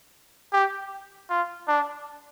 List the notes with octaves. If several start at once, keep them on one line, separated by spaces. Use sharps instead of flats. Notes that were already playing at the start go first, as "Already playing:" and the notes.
G4
F4
D4